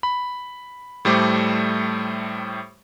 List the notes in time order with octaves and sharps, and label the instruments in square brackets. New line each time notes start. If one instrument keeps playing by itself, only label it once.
[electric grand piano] B5
A2 G3 A3 C5 D6